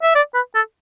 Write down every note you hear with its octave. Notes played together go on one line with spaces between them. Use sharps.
E5
D5
B4
A4